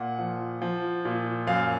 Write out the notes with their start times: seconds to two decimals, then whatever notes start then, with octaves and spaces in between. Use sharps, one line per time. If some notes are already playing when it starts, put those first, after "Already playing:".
Already playing: A#2 F#5
0.19 F3
0.62 F3
1.05 A#2
1.47 F#2 F5